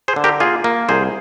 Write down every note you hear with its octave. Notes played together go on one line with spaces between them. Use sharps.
G#4 C5
D3
G4 A#4
A#3 F4 G#4
A#3
C2 G#4 C5